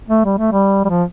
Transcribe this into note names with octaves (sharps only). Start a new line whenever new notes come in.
A3
G3
A3
G3
G3
F3